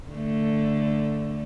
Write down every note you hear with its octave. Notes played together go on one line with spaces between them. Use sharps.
D3 A3